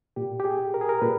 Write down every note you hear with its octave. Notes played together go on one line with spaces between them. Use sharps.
A#2 G4
G4
G#4
A#4
G#4
A#4
A#2 B4